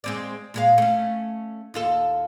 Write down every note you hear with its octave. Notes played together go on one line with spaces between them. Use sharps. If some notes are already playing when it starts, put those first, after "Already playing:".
G#3 C4 D5
A#2 G#3 F5
A3 C#4
D#2 F4 A4